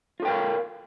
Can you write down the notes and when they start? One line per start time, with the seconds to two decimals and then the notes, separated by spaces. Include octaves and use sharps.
0.20 F4
0.22 A4
0.25 G5
0.28 A#4
0.30 F5